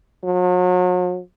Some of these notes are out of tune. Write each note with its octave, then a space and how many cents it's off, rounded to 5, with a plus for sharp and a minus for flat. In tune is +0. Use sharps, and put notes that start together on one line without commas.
F#3 -40